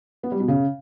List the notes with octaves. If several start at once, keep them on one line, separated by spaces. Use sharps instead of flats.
B3
G3
B2
C#3